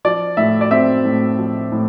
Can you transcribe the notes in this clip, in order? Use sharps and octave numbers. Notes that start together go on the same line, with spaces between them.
F3 D5
A2 E5
D5
C4 E5
A2
F3
A2